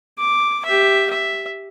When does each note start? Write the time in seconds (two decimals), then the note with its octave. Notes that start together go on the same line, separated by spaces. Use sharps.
0.18 D6
0.65 G4 E5
1.10 E5